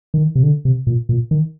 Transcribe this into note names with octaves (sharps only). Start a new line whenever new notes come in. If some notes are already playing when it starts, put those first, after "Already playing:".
D#3
C3
D3
C3
A#2
A#2
D#3